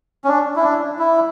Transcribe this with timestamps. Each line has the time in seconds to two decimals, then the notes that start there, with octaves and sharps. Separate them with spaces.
0.24 C#4
0.28 D4
0.56 E4
0.64 D4
0.99 E4